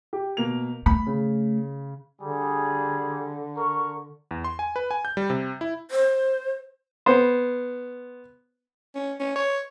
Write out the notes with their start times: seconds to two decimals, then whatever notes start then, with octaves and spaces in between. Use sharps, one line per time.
0.13 G4
0.37 B2 A#3 F7
0.86 A3 B5
1.07 C#3
2.22 D3 G3 G#4
3.57 A#4 C#6
4.31 E2
4.44 C6
4.59 G#5
4.76 B4
4.91 G#5
5.05 G6
5.17 G3
5.30 C3
5.61 E4
5.91 C5
7.06 B3 C5
8.95 C#4
9.20 C#4
9.36 C#5